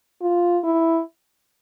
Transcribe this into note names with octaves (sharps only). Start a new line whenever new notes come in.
F4
E4